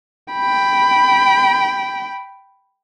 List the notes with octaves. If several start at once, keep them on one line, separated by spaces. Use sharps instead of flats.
G5 B5